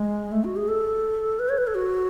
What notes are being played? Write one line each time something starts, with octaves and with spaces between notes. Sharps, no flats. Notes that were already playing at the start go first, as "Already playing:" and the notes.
Already playing: G#3
A3
F#4
G#4
A4
B4
C#5
B4
A4
F#4